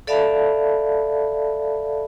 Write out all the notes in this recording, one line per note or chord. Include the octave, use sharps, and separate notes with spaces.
A4 D5 E5 F5 A5 B5